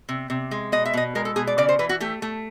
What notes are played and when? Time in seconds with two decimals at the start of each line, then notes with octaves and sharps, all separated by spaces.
0.09 C3
0.30 C3
0.51 G#3
0.72 B2 D#5
0.85 E5
0.93 B2 D#5
1.15 G#3 A#4
1.25 A4
1.36 B2 G#4
1.47 D5
1.58 C#3 D5
1.69 C5
1.79 E3 B4
1.89 F#4
2.00 A3 G4
2.22 A3